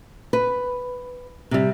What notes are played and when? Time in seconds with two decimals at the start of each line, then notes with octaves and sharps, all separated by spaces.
0.33 B4
1.51 C3 G3